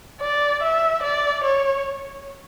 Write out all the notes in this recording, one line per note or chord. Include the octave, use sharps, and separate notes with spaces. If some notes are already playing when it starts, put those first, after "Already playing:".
D5
E5
D5
C#5